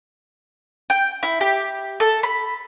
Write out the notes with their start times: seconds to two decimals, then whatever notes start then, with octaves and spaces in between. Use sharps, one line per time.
0.90 G5
1.23 E4
1.41 G4
2.00 A4
2.23 B5